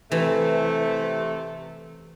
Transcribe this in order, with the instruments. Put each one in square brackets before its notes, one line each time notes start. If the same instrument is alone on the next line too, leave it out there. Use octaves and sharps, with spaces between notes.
[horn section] C3 A3 [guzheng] E3